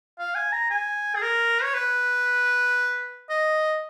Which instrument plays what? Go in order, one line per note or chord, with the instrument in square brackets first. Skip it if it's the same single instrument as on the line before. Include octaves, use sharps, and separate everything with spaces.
[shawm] F5
G#5
A#5
G#5
G#4
A#4
C#5
B4
D#5